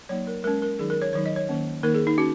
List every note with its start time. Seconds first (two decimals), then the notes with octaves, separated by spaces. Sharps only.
0.09 F#3 A#3 D#4 C#5
0.27 A#4
0.44 G#3 C#4 A#4
0.62 A#4
0.79 D#3 F#3 D#4 G#4
0.90 A#4
1.02 C#5
1.13 D#3 F#3 D#4 C#5
1.26 D#5
1.36 C#5
1.49 D#3 A#3 C#4
1.83 D#3 A#3 D#4 A#4
1.94 G#4
2.07 D#4
2.18 C#4 F#4